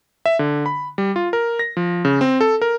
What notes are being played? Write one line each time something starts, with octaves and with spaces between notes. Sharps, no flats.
E5
D3
B5
G3
F4
A#4
A#6
F3
C#3
C4
A4
A#4